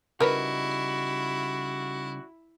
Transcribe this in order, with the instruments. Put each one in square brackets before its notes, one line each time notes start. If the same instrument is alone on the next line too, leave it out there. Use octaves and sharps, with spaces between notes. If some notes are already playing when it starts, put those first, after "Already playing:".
[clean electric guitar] C#3 G3 D#4 [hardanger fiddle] E4 [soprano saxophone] F#4 [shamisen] A#4 B4